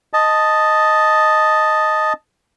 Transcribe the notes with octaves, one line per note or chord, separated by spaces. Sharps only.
D#5 A5